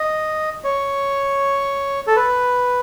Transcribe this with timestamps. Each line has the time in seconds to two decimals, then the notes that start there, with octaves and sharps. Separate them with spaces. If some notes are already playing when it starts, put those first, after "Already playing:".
Already playing: D#5
0.64 C#5
2.07 A4
2.17 B4